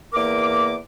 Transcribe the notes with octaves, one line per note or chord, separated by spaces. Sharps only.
E2 A#3 A#4 D6